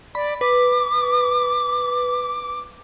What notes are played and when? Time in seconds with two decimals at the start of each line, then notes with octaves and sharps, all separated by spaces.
0.15 D5 B5
0.41 B4 D6